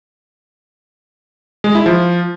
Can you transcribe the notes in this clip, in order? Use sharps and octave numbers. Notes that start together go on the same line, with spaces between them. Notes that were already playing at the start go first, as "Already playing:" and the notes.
G#3
E4
F3